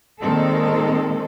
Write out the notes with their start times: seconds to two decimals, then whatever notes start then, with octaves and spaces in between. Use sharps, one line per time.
0.20 A#2 D#3 G#3 C4 A4